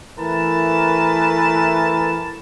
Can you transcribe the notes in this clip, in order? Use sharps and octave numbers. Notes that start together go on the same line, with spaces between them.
E3 A3 A#4 B4 A5